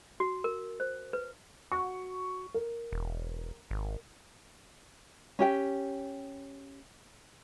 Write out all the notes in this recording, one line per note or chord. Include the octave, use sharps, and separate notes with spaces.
F#4
A#4
C5
B4
F#4 C#6
A#4
E1
G#1
C#4 G4 G5